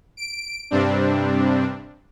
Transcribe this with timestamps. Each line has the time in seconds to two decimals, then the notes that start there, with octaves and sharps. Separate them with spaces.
0.17 D7
0.71 G2 C3 G3 C4 D4